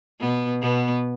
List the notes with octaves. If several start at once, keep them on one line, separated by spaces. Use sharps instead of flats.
B2 B3
B2 B3